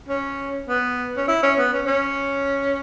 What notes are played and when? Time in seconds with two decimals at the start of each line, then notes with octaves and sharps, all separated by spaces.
0.09 C#4
0.69 B3
1.16 C#4
1.28 E4
1.43 C#4
1.58 B3
1.73 C#4
1.87 C#4